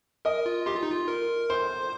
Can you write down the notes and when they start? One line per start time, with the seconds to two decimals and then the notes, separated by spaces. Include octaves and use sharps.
0.25 A#4 D#5
0.46 F4
0.66 G4 C6
0.75 F4
0.83 D#4
0.91 F4
1.08 A#4
1.50 C5 C6